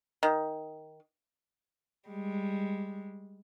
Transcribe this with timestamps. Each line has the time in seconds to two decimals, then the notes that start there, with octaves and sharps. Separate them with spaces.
0.23 D#3
2.08 G3 G#3